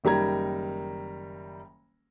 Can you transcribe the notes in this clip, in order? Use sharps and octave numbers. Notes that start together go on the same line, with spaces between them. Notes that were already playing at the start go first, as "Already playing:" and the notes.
F#1 D#3 G3 A#5 G#6